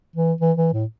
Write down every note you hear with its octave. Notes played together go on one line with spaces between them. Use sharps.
E3
E3
E3
A2